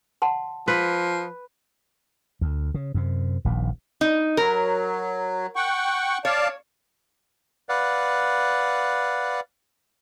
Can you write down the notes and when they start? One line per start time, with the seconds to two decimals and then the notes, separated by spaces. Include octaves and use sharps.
0.22 F#5 A5 C6
0.68 F3 B4 C6
2.41 D2
2.74 C#3
2.94 F#2 C3
3.45 D#1 A#1 D#2
4.01 D#4
4.37 F#3 A#4
5.56 F#5 G5 C#6
6.25 C#5 D5 F5 A5
7.69 B4 D5 F5 F#5